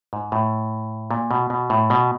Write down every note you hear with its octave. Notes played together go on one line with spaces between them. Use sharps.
G#2
A2
A#2
B2
B2
A2
B2